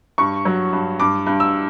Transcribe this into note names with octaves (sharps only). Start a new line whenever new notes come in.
G2 C#6
F#3
G2
G2 D6
G2
E6